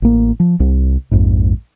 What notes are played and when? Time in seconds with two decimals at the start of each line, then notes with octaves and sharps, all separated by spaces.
0.02 A1 A#3
0.40 F3
0.60 C2
1.11 A#1 F2 G#2